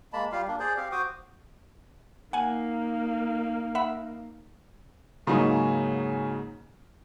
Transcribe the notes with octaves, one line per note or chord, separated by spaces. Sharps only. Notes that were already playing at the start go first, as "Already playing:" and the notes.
G#3 A#3 A5 B5
G3 F4 G4 F5
A#3 D4
G#4 C5 D5
C4 G4 F5
F#4 C5 D6 D#6
A#3 D#4 F#5 G#5
E5 F#5 B5
G#2 C#3 F#3 A#3 C#4 D#4